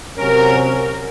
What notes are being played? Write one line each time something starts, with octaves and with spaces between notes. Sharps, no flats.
C3 F#3 C#4 A#4